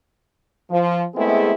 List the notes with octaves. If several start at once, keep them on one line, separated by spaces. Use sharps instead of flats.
F3
G#3 A3 B3 C4 E4 G#4